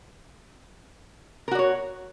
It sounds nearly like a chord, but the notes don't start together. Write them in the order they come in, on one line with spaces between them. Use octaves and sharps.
A#4 F#4 D5 C#5